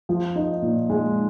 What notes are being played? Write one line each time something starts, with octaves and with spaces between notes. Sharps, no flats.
F3
D#4
A#2
G#3